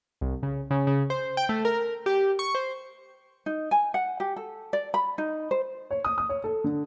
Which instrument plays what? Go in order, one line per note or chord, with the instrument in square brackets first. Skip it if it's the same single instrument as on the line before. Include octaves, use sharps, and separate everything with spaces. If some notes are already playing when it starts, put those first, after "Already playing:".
[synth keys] C2
C#3
C#3
C#3
C5
G5
A3
A#4
G4
C#6
C5
[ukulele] D#4
G#5
F#5
G4
A4
D5
B5
D#4
C5
[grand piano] C#5
D#6
D#6
C#5
A4
D3